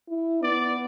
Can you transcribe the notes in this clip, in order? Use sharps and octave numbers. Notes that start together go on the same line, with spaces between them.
E4
B3 D5